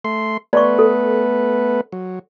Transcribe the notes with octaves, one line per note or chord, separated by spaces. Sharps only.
A3 C6
A3 B3 B4 D5 C6 C#6
A4
F#3